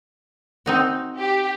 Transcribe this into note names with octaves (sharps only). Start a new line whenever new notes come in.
C4 D#4 F#4
G4